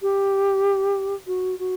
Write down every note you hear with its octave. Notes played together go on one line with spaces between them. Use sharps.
G4
F#4
F#4